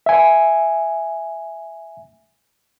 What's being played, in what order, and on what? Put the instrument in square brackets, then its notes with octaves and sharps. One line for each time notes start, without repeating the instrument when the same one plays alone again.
[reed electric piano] E5 G#5